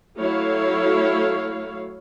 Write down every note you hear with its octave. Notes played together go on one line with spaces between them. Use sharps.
F#3 A3 E4 C#5 F5